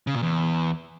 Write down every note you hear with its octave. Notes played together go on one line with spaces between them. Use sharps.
C#3
A#2
E2